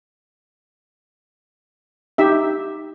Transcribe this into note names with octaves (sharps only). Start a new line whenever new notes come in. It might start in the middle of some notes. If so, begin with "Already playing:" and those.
D#4 G4 E5